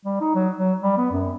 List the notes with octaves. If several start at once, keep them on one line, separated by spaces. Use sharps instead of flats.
G3
D#4
F#3
F#3
G3
B3
F#2